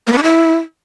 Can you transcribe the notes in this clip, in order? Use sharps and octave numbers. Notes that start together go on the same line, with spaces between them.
A#3
B3
D4
E4